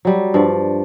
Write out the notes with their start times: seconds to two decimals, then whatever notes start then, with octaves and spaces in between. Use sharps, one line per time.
0.05 F#3 G3
0.34 G2 F3 D5